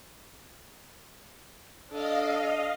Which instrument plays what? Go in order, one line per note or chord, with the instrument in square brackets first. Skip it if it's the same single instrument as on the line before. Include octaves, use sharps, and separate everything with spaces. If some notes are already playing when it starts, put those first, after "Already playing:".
[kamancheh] D4 A4 [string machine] D#5 F5